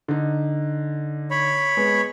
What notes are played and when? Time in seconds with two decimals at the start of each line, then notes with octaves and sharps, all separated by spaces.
0.08 D3 D#4
1.31 C#5 B5
1.77 G#3 B3